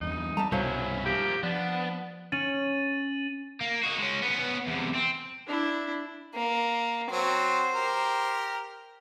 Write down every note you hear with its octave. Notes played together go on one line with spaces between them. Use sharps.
E2 G2 D#4
G3 E5 A5 A#5
C2 G2 B2 F#3 C#4 E4 C5 F5
F3 A#3 G4
F3 B3 D4
C#4 A6 D#7 F#7
A#3
D#4 F#4
G#3 C#4
B3 C#4
E2 C3
C4
D4 E4
A#3
F#3 C4 C5
G4 A#4